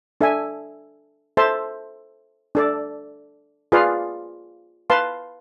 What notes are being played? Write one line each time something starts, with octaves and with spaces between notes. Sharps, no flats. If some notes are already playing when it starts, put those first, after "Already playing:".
D4 A4 E5 G#5
A4 C5 E5 A5 C6
D4 A4 D5
F4 G#4 B4 D5 F5
B4 F5 A5 C6